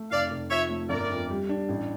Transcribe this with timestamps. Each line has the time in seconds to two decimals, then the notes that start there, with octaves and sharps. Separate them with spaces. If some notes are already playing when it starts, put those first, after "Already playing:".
Already playing: A3
0.11 F1 D5 F5
0.30 F1
0.51 F3 C#5 E5
0.70 A3
0.89 G1 A#4 D5
1.10 F2
1.30 G3
1.49 D4
1.69 A1